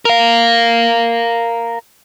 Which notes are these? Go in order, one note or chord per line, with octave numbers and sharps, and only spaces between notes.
A#4 F5